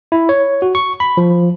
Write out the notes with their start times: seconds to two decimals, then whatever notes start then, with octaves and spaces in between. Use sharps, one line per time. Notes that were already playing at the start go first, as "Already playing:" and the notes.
0.12 E4
0.29 C#5
0.62 F#4
0.75 C#6
1.00 B5
1.17 F3